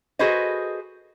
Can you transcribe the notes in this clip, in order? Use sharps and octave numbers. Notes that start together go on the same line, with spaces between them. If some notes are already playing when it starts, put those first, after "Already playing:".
F#4 G#4 A4 B4 C5 D#5